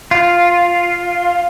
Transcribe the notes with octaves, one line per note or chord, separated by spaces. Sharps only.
F4